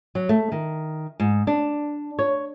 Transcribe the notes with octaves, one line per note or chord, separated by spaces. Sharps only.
F#3
A3
D#3
G#2
D4
C#5